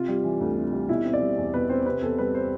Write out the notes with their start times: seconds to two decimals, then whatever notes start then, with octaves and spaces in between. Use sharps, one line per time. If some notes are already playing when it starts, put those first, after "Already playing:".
Already playing: C3 F4
0.08 G3
0.24 E3
0.41 D2
0.57 C3
0.73 G3
0.89 B2 E4
1.05 C4
1.13 D5
1.21 G3
1.37 E2
1.53 B2 B4
1.69 C4 C5
1.86 C3 B4
2.02 E2 A4
2.18 G3 B4
2.35 C5